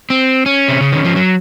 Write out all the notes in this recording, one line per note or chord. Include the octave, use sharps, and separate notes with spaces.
C4
C#4
C3
C#3
D#3
F3
F#3